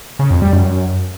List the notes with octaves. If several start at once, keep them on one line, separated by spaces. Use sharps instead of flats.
C#3
F2
G3
F#2